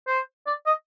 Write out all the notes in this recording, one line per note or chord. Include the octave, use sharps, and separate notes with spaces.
C5
D5
D#5